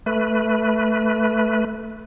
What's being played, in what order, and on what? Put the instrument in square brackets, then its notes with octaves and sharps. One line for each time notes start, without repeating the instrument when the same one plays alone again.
[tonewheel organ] A3 B4